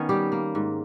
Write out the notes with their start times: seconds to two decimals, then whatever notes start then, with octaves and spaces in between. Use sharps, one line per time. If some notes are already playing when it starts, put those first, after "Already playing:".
Already playing: D#3 B3 C#4
0.09 G3 G4
0.32 A#3
0.55 G#2